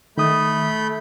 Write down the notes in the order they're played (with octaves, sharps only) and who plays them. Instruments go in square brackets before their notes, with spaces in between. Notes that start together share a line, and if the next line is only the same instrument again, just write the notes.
[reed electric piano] D#3 D#6 [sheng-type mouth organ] A3 B5 G6